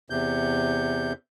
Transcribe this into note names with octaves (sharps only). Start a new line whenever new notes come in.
E2 C3 G6